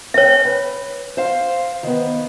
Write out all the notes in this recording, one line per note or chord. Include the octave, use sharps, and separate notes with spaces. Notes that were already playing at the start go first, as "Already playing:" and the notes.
C#4 C#5 E5 G5
B4
C5 F5
D#3 B3